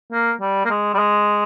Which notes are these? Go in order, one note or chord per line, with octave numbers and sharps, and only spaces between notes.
A#3
G3
A#3
G#3
G3
G#3